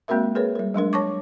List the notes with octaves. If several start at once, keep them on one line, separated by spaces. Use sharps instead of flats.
G#3 A#3 C4 F#4 A#4 E5
G#4 A#4 B4 C#5
G3 A#4
F#3 G#3 D4 A#4
C#5 A5 C#6 D6